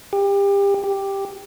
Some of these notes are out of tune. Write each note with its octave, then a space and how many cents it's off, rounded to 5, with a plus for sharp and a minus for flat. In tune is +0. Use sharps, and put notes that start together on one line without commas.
G4 +30
G4 +5